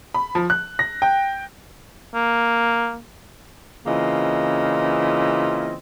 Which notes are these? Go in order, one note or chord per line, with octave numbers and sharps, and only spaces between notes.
B5
F3
F#6
A#6
G5
A#3
C#3 E3 A#3 C4 F4 D#5